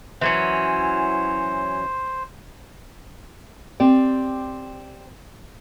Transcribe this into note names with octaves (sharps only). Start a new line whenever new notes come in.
E3 F#3 C#4 C5
C4 G4 D5